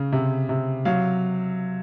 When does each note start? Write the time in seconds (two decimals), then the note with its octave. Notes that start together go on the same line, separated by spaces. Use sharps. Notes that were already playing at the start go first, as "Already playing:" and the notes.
Already playing: C#3
0.12 C3
0.49 C3
0.85 F#3 F5